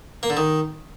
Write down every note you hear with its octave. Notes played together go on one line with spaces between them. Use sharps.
A#3
D3
D#3